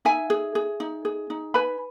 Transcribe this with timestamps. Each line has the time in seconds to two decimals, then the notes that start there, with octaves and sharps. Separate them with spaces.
0.05 D#4 E5 G#5
0.30 G#4
0.55 G#4
0.80 D#4
1.05 G#4
1.30 D#4
1.54 B4 G#5 B5